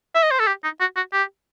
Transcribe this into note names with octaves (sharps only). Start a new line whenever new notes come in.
E5
D#5
C5
A4
G4
D#4
F#4
F#4
G4